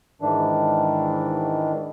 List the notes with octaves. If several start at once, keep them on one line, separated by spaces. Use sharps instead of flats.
G#2 D#3 E3 D4